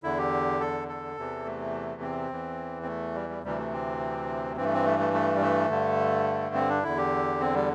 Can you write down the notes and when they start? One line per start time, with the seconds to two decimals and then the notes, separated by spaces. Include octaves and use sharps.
0.03 E2 D3 E4
0.18 G4
0.60 A4
0.88 A4
1.17 E2 C3 E3
1.45 A3
2.02 C4
2.30 E2 E3
2.83 C4
2.86 A3
3.15 G3
3.29 G3
3.44 D2 C3 E3 G3
3.58 A3
3.72 C4
4.56 G2 E3 C4
4.65 A3
4.73 C4
4.85 A3
4.99 A3
5.13 A3
5.35 G3
5.41 A3
5.70 G2 D3
6.55 C4
6.69 D4
6.83 E2 D3 E4
6.97 G4
7.40 C4
7.54 G3